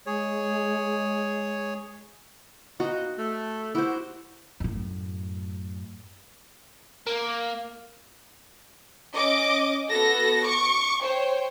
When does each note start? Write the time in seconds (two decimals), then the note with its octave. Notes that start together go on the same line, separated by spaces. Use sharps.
0.06 G#3 G#4 C#5
2.80 A#2 B3 D#4 F#4
3.18 A3
3.75 E4 F#4 G4 C5
4.60 F#2 A2
7.07 A#3
9.14 C#4 D#5 D6
9.90 B3 F#4 A4 A#6
10.43 C#6 D6
11.02 C5 C#5 G5